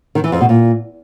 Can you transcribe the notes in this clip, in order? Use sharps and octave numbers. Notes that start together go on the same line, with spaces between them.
D#3
E3
F2
B2
A#2